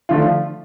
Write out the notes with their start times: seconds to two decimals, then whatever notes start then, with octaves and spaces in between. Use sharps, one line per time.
0.09 D3 F3 A3 F4